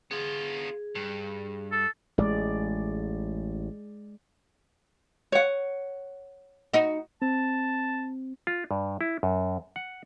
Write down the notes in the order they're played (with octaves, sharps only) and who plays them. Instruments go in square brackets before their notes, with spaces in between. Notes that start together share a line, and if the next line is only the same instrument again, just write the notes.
[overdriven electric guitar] B3 F4 [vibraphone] G#4
[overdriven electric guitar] G2
[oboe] A4
[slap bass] A1 [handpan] G#3 D5
[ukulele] C#5 F#5
[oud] D#4 F#4
[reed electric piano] C4 [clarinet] A5
[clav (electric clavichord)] F4
G2
E4
F#2
F#5